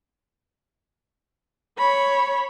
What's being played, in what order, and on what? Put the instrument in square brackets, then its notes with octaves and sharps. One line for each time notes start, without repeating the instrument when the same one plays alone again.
[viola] C#5 B5